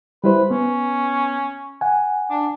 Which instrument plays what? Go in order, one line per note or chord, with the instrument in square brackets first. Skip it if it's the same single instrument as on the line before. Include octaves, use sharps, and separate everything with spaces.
[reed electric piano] G3 E4 C5 [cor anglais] B4
[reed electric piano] B3 [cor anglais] C#4
[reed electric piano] F#5 G#5
[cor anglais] D4